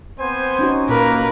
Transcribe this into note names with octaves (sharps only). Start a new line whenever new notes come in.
B3 C4 C5 G#5
C#4 D#4 F#4
A#2 A#3 A#4 B4